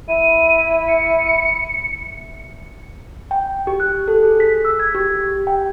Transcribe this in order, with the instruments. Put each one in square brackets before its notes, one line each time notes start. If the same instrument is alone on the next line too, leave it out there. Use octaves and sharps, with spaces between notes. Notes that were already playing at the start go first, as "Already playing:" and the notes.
[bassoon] E4 [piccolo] D#7
[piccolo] C#7
[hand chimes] G5
G4
F#6
A4
G#4
B6
E6
G#6
G4
G5